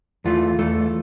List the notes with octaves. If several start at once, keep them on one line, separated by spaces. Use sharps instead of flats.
E2 E3 A3 F4
E2 E3 A3